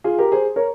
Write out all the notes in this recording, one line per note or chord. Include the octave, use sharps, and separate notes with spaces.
F4 G#4
G4 A#4
G#4 C5
A#4 C#5